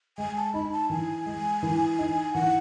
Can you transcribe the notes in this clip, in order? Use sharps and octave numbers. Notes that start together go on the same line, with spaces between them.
G#3 G#5
A5
D#4 B5
A5
E3 G#5
G#3
E3
D#4
E3 F#5